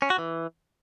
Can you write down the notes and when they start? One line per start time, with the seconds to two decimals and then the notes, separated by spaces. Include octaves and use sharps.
0.02 C#4
0.10 F#4
0.18 E3